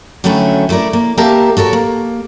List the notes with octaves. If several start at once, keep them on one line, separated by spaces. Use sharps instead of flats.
D3 D#3 F#3 A3 C#4 E4
A3 E4 G#4 A#4 D5
A#3
A#3 G4 A#4 E5 F5 A5
F#4 A4 A#4 C#5
A#3